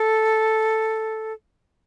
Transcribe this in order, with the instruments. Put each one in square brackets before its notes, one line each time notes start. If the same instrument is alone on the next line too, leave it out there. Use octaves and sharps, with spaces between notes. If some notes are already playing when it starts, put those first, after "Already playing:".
Already playing: [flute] A4